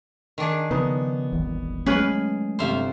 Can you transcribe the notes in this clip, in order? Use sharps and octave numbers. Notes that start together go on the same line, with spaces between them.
D#3 D4 G#4
C#3 F3 B3 D#4
D#1 G#1 E3
F#3 G#3 A3 C#4 G#4 B4
G1 C3 C5 E5 F5